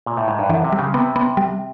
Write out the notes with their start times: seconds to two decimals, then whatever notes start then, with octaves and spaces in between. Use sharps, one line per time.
0.06 A#2
0.17 A2
0.28 G#2
0.39 G2
0.49 F#2 E3
0.64 C3
0.72 G3
0.79 C#3
0.94 C3 B3
1.16 B3
1.37 G3